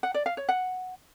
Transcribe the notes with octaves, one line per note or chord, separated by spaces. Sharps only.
F#5
D5
F5
C#5
F#5